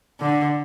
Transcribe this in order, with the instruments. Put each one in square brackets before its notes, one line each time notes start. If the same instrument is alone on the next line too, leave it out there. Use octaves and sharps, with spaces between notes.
[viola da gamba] D3